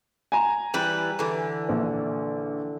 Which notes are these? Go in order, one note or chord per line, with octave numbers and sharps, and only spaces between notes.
G#5 A#5
E3 G3 B4
D3 E3
A#1